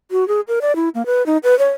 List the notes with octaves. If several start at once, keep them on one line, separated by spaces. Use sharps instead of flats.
F#4
G#4
A#4
D5
E4
A#3
B4
D#4
B4
C#5